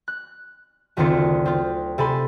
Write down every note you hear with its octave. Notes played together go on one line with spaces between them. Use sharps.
F#6
F#1 D2 D#3 C4 F4 C#7
C4 F4
C3 A4 G#5 B5 C6